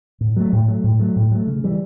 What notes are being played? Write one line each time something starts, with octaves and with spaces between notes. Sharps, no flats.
A2
F#3 A3
A2
F#3 A3
A2
F#3 A3
A2
F#3 A3
C#3
E3 G3